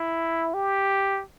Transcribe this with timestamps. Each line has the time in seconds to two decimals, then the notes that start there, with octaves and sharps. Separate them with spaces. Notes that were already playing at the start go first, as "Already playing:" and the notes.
Already playing: E4
0.54 G4